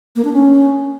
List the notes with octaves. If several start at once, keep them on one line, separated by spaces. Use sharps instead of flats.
A#3
D4
C#4